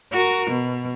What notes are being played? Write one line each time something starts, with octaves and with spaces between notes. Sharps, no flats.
F#4 A#4
B2